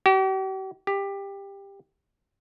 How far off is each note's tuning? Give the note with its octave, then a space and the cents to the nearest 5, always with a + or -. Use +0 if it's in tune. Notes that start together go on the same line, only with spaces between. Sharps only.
G4 -45
G4 +15